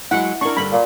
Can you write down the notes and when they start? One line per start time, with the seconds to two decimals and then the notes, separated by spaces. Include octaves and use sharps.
0.11 F#3 G#3 E4 F#5
0.41 D4 E4 A#4 C#6
0.57 G2 D3 B5
0.72 A#2